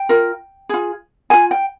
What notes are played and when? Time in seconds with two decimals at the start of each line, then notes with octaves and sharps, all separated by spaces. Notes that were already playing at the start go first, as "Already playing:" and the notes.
Already playing: G5
0.09 F4 A#4
0.69 F4 G#4
1.30 G#4 G#5
1.33 F4
1.51 G5